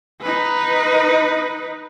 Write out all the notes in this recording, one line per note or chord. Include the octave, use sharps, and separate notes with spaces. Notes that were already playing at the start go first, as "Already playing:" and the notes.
D#4 B4